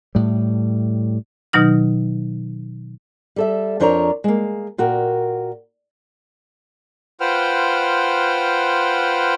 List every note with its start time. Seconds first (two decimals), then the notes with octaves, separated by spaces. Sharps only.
0.15 A2 G3
1.53 B2 D#3 F#3 D#4 F6
3.36 G3 A4 E5
3.80 F2 F3 D4 A#4 C#5 A#5
4.24 G#3 A#3
4.78 A#2 F#4 A#4 G5
7.21 F4 B4 C5 F#5 G5 F6